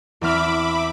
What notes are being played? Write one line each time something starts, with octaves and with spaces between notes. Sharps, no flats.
E2 C4 E5 B5 D6 F6